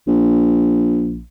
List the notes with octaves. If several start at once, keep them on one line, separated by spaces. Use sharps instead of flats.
A#1